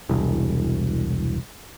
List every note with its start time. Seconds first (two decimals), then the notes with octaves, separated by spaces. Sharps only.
0.09 E1 C2